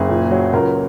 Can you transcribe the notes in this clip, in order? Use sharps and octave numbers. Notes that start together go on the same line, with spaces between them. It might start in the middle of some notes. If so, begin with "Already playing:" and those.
Already playing: F#1 G#4
A#2
F#3
C#2 A#4